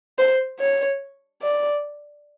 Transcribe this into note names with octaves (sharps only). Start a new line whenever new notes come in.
C5
C#5
D5